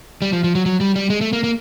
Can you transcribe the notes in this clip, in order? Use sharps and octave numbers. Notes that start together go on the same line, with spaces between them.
G3
F3
F3
F#3
F#3
G3
G3
G#3
A3
A#3
A#3